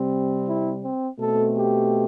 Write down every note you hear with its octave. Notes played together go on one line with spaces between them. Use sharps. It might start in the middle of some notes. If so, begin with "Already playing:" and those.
Already playing: C3 G3 C4
E4
C4
B2 A3 C4 A4
G4